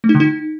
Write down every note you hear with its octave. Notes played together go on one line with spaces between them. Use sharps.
A3
D#4
D3
D#4